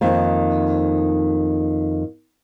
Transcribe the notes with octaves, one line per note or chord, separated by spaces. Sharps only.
F2 D#3 A#3